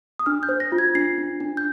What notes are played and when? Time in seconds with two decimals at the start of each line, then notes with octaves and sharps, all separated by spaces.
0.19 D#6
0.26 D4 F6
0.43 G6
0.49 C5
0.60 A#6
0.72 F4
0.78 G#6
0.95 D4 C7
1.18 D4
1.40 D4
1.57 G6